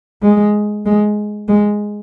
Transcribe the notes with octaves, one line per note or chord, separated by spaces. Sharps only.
G#3
G#3
G#3